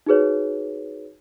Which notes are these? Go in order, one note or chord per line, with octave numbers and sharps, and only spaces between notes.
D#4 F#4 G#4 B4 C#5